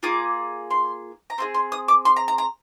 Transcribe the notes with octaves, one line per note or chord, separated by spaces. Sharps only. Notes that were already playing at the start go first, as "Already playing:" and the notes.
A#3 F4 G#4 D6
C6
A#5
C4 F4 G#4 C6
C6
D#6
D6
C6
A#5
A#5
A#5